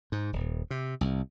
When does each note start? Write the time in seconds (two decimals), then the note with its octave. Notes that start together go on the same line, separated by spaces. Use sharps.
0.12 G#2
0.33 D#1
0.71 C3
1.01 C2